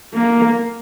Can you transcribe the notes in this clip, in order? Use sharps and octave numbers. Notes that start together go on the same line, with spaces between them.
A#3